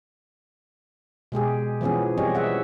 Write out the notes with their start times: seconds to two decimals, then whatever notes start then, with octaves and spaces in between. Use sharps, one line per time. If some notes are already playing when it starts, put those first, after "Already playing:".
1.32 B2 G#3 G4 G#4
1.81 E3 F3 B3 C#4 G#4
2.18 G3 C4 G4 G#4 C#5 D#5
2.35 G#4 E5 F#5